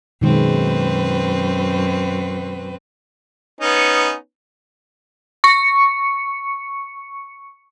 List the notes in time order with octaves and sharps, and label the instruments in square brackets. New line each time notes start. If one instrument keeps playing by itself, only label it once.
[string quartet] F#2 C4 B4 [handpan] B2 D#3 G#3
[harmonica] B3 C#4 D#4
[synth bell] C#6 C#7